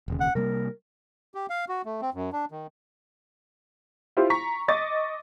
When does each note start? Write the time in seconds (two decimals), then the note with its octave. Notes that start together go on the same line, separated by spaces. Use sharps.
0.08 E1 D#2 C#3
0.20 F#5
0.35 C3 G3 A#3 A#4
1.35 G4
1.50 F5
1.69 F#4
1.85 A3
2.02 C4
2.14 F#2
2.33 D4
2.51 D#3
4.17 E4 F4 G4 C5
4.30 A#5 C#6 B6
4.68 D#5 C#6 D6 A6